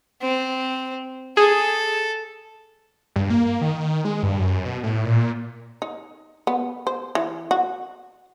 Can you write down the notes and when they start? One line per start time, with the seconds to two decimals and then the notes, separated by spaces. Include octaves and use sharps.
0.21 C4
1.37 G#4 A4
3.16 G2
3.30 A#3
3.61 D#3
4.05 G#3
4.23 G2
4.39 F#2
4.65 B2
4.83 A2
5.05 A#2
5.82 D#4
6.47 B3
6.87 C5
7.15 E3
7.51 F#4